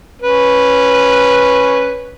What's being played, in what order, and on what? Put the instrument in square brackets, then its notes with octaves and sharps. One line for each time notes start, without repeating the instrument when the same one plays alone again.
[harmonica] C#4 B4